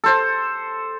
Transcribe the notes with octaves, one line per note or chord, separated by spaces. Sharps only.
A4 C5